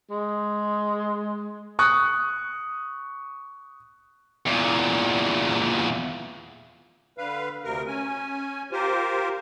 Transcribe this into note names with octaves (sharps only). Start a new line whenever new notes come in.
G#3
C#6 D#6 F#6
E2 A#2
D3 B4 F5
D2 C3 A#4
C#4 G#5
F4 G4 A#4 C5